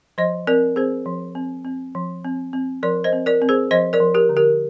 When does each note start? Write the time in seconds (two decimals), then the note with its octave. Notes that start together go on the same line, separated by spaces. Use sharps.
0.18 F3 C5 D#5
0.47 C4 A#4 D5
0.76 C4 G#4 C5
1.06 F3
1.35 C4
1.65 C4
1.95 F3
2.24 C4
2.53 C4
2.83 F3 A#4 D5
3.04 C5 D#5
3.13 C4
3.26 A#4 D5
3.42 C4
3.49 G#4 C5
3.71 F3 C5 D#5
3.93 A#4 D5
4.00 F3
4.14 G4 A#4
4.29 D3
4.37 G4 A#4